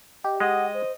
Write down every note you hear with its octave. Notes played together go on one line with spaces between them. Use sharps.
G4 D#5
G#3 D#5 F#5
C5